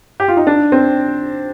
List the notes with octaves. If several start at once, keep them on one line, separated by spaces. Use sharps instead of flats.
G4
F4
D#4
D4
C4